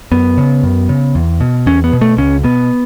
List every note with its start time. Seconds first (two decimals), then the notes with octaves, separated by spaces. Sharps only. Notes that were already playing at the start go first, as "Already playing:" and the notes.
0.12 F#2 B3
0.38 C#3
0.63 F#2
0.89 C#3
1.15 E2
1.40 B2
1.66 E2 C#4
1.84 B3
1.93 B2
2.01 A3
2.18 C#2 C#4
2.44 B2 B3